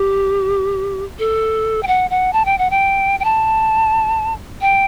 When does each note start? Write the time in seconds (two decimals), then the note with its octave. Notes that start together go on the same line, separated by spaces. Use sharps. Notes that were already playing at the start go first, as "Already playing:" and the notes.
Already playing: G4
1.19 A4
1.83 G5
1.87 F#5
2.10 F#5
2.33 A5
2.45 G5
2.58 F#5
2.70 G5
3.20 G5
3.24 A5
4.61 G5